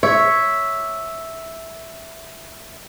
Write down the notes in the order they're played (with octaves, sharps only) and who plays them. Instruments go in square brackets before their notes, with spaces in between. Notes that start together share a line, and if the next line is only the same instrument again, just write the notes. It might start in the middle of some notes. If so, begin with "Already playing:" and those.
[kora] C#5 [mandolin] E5